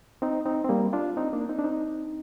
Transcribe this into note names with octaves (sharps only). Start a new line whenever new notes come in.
C4 D#4
C4 D#4
C4
G3 A#3
D4 F4
C4 D#4
A#3 D4
C4 D#4
D4
C4 D#4